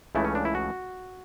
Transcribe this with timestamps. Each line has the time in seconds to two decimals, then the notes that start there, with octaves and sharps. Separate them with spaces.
0.15 C#2 C#3 E3 A3 E4
0.25 C#4
0.35 D4
0.45 E4
0.55 F#4